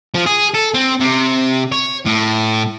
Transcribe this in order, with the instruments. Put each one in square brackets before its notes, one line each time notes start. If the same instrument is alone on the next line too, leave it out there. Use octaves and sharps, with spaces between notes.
[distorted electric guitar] F3
G#4
A4
C4
C3
C#5
A2